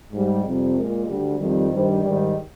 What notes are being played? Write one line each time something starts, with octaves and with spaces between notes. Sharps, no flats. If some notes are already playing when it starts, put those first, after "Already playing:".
G#2 G3
F2 C3 G3
A#2 G#3 A#4
D2 D3 G3
F2 D#3 G3
G2 D#3 G3 C5
G#2 D#3 G3 D5